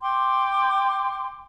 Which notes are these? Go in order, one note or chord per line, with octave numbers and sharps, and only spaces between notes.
G5 C6 D6